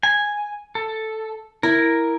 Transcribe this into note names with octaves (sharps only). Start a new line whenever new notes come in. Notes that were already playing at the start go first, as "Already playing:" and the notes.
G#5
A4
E4 A#4